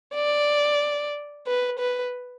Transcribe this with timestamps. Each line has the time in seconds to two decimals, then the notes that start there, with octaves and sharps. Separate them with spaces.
0.15 D5
1.47 B4
1.79 B4